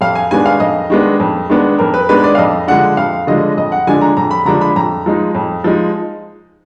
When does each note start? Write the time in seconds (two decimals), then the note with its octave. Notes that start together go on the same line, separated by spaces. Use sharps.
0.01 F2 F5
0.15 G#5
0.31 D#3 G#3 B3 D4 G#5
0.46 F5
0.60 F2 D#5
0.90 D#3 G#3 B3 D4
1.20 F2
1.49 D#3 G#3 B3 D4
1.79 F2 A#4
1.94 B4
2.09 D#3 G#3 B3 D4 B4
2.24 D5
2.35 F5
2.38 F2 D#5
2.68 D3 F3 G#3 D4 F#5
2.97 F2 F5
3.27 D3 F3 G#3 D4 D#5
3.57 F2 D#5
3.72 F#5
3.87 D3 F3 G#3 D4 G#5
4.02 A#5
4.17 F2 A#5
4.31 B5
4.45 D3 F3 G#3 D4 A#5
4.61 B5
4.76 F2 A#5
5.06 F3 G#3 D#4
5.35 F2
5.64 F3 G#3 D#4